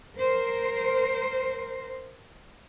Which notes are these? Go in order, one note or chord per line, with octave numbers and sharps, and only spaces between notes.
A#4 C5